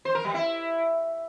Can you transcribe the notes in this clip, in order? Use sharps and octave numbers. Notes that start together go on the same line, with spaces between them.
C5
A#4
G3
E4